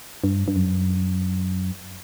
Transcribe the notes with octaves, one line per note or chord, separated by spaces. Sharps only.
G2
G2
F#2